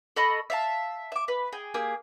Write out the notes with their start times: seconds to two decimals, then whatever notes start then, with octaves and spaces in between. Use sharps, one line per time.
0.16 A4 D#5 B5 C#6
0.50 E5 F5 A5
1.12 E5 D6
1.28 B4
1.53 G#4 G5
1.74 A#3 G4 G#4 E6